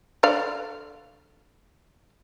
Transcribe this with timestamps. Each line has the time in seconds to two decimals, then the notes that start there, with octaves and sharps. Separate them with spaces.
0.23 D3 D5 F5